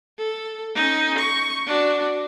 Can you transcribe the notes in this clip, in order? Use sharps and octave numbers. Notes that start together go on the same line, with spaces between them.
A4
C#4 D#4
C#6
D4 F#4